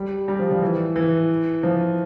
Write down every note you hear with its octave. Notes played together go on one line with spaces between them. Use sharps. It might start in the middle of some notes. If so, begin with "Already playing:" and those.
Already playing: G3
G3
F3
F3
E3
E3
F3